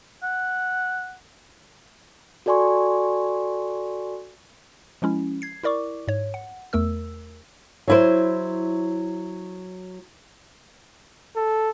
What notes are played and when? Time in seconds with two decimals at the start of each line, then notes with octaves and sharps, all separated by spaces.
0.23 F#5
2.46 F#4 A4 D5 G#5 C6 C#6
5.02 F3 G#3 C#4 E4
5.42 G#6 C7
5.63 E4 A#4 D5 C#6 D6
6.08 G#2 C#5
6.34 F#5
6.73 E2 A3 A#4 E6
7.88 F#3 E4 C5
11.36 A4